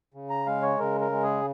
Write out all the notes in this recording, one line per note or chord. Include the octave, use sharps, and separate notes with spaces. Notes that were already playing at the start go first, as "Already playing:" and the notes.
C#3
A#5
G#3 F5
C#5
C#3 A#4
A#4
G#3
G#4